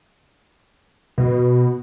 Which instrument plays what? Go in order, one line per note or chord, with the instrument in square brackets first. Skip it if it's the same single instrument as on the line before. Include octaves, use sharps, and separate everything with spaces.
[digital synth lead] B2